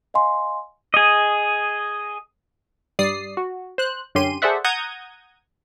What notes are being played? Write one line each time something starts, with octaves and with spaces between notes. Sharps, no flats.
D#5 F5 G#5 C6
G#4 D#5
G2 G3 D5 D#6 C7
F#4
C5 F#6
F#2 D3 C#4 G4 C6 D#7
G#4 A4 C5 D5 E5 F#5
F#5 A#5 D#6 G6 G#6